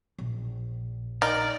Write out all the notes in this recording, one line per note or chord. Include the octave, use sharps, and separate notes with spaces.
A#1
D#4 A#4 D5